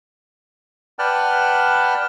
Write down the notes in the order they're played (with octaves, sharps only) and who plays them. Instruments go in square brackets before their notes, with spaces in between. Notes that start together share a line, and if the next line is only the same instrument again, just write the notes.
[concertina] B4 D5 F#5 G5 A5 F6